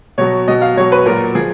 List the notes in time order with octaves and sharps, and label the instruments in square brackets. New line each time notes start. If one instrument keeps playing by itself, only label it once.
[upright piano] B2 F#3 C#5
B2 F#3 D#5
F5
B2 F#3 C#5
B4
A#2 F#3 A#4
F3 G#4